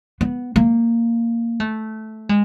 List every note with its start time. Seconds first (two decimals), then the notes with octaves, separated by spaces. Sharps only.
0.21 B3
0.56 A#3
1.60 A3
2.29 G#3